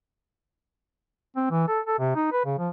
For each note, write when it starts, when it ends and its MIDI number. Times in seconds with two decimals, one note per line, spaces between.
1.37 1.47 60
1.51 1.66 52
1.68 1.80 69
1.87 1.99 69
1.99 2.11 48
2.15 2.30 63
2.33 2.43 71
2.46 2.57 49
2.59 2.70 53